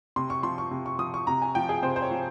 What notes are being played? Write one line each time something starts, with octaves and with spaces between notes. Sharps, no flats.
C3 C6
C#6
F3 C6
C#6
C3
C#6
F3 D#6
C#6
C3 A#5
G#5
F3 G5
G#4
C3 C5
C5
C#5
F3